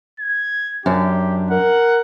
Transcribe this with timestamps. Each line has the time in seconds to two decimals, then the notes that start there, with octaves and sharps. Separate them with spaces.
0.20 G#6
0.86 F#2 D4 G4
1.51 A#4 F#5